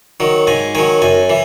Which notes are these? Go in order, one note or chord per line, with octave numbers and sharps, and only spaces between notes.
D#3 F#3
G#2 G#5
D#3 F#3 G#5
F#2 G#5
E3